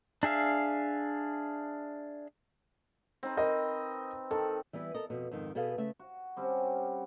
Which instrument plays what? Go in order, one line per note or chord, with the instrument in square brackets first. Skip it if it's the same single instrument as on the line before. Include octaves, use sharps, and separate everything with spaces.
[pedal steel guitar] D4 G#4 E5 F5
[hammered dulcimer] C4 D#4 B4
[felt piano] A#4 D#5
[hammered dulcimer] D#3 [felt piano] A4
[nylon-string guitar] E3 G3 B3 E4 B4
A4 A#4 D#5
F2 B2
F2 G#2 D#3
B2 G#4 A4 B4 F5
C#3 A3 E5
[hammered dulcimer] F#4
G3 C4 C#4 F#4